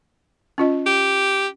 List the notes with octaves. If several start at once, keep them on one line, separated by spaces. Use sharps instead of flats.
C#4 F4 D#5
G4